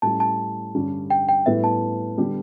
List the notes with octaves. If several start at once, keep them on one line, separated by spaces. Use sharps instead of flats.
A2 G3 C#4 A5
A5
G2 D3 G3 C#4 G4
G5
G5
A2 G3 B3 E4 B4 E5
A5
D3 G3 B3 D4 G4